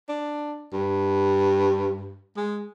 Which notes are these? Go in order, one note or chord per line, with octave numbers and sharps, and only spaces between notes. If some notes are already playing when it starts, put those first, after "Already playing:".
D4
G2
G#3